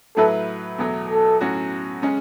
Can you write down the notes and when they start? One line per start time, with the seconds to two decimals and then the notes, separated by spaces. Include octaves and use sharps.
0.16 A2 F#3 A3 E4 A4 B4
0.78 E2 B2 F#3 A3
1.10 A4
1.41 A2 F#3 C#4 F#4
2.02 C#3 G#3 C#4